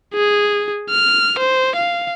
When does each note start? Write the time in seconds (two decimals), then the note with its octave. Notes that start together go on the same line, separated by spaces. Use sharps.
0.14 G#4
0.90 F6
1.39 C5
1.76 F5